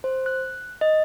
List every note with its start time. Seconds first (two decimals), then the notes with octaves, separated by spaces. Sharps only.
0.04 C5
0.26 F#6
0.81 D#5